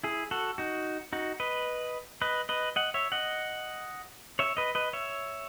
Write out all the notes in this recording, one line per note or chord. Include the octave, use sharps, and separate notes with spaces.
E4 G#4
F#4 A4
D#4 F#4
D#4 F#4
B4 D#5
B4 D#5
B4 D#5
D#5 F#5
C#5 E5
D#5 F#5
C#5 E5
B4 D#5
B4 D#5
C#5 E5